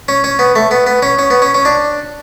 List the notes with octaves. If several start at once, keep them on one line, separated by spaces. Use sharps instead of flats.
C#4
C#4
B3
A3
B3
B3
C#4
C#4
B3
C#4
C#4
D4